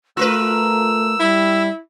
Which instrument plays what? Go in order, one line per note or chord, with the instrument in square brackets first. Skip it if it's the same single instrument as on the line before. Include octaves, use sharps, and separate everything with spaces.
[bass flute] A3 [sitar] F4 A#4 B4 [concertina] E6
[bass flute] G3 [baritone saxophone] E4